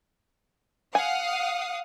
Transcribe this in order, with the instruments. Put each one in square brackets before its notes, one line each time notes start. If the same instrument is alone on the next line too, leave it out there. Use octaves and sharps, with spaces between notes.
[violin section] F5 F#5 D#6 [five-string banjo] G#5